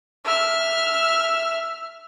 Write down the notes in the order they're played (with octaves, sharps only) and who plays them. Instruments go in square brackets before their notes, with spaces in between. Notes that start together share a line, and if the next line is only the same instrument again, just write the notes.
[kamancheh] E5 F6